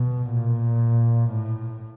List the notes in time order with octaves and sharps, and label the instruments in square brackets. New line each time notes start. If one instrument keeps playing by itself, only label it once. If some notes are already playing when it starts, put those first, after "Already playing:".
Already playing: [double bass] B2
A#2
A2